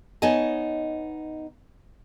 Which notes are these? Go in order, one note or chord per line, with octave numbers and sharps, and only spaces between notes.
B3 D#4 C#5 D#5 G#5 A5